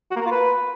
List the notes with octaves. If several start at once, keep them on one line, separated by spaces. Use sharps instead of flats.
F#4
A#3
A#4
F4
B4